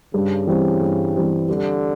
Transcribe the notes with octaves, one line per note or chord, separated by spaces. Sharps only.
G2 C#3
E3 G3 C4
G2
E3 G3 C4
D3 G3